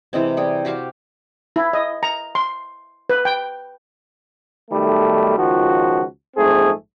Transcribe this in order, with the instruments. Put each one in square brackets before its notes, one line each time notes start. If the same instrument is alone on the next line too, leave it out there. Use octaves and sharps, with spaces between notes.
[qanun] C3 E3 G#3 C4
G3 G#4 G5
F#4 G4 C5 F5
[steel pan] E4
D#5
A#5
C6
B4
G5
[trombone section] B1 D#3 G3 A3
C#2 D#3 F3 F#4
A#1 G#2 A3 C4 G#4